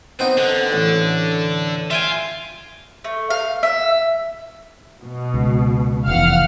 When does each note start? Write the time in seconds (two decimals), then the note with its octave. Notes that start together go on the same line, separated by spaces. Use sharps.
0.19 B3 C4 D#4
0.38 D3
0.73 A1
1.91 F4 E5 G5 G#5
3.04 A3
3.30 F5
3.63 E5
5.02 B2
5.34 C#2
6.08 F1 E2 F5 F#5 F6